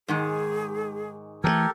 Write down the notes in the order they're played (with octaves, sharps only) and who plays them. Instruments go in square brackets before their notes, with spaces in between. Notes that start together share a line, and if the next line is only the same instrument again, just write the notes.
[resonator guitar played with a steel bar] G#2 D#3 G#3 [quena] G#4
[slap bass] E3 F3 A3 [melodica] G4 A4 A#4 [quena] G#6